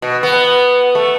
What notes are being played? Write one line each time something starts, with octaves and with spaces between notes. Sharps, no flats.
B2
B3
A3